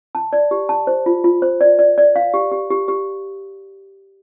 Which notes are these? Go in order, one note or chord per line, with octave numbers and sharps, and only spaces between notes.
A5
D5
G4
A5
C5
F4
F4
C5
D5
D5
D5
F5
G4
G4
G4
G4